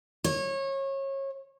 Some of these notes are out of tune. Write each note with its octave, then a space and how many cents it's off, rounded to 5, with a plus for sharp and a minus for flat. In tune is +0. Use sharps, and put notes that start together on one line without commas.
C#5 -25